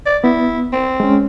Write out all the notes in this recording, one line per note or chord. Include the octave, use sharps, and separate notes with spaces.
D5
B3 E4
C4
G#3 C#4